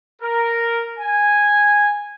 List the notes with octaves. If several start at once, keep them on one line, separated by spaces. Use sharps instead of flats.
A#4
G#5